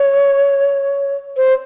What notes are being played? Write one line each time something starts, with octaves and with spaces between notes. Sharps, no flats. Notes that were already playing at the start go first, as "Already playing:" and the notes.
Already playing: C#5
C5